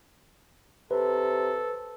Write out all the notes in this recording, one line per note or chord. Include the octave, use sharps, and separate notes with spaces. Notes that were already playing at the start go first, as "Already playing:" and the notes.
C3 A4 B4